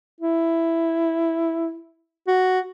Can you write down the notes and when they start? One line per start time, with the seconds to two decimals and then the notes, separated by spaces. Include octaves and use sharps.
0.21 E4
2.28 F#4